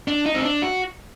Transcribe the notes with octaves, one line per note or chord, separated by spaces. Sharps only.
D4
D#4
C4
D4
F#4